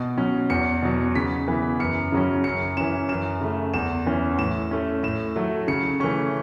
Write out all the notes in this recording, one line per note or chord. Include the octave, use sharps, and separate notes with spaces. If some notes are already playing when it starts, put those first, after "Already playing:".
Already playing: B2
F#3 C#4
E2 C#7
B2 F#3
C#3 B6
E3 B3
F#2 C#7
C#3 F#3 C#4
F#2 C#7
E3 C#4 E7
F#2 E7
C#3 A3
E2 E7
E3 C#4
A2 E7
A3 C#4
A2 E7
F#3 A3
C#3 C#7
E3 A3 C#4 C#6